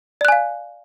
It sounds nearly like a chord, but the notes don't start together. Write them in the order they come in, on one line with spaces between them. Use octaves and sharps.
D5 F#6 G#5 F5